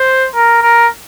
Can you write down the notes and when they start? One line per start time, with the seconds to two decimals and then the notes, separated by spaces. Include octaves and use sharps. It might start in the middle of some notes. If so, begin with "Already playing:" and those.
Already playing: C5
0.34 A#4
0.62 A#4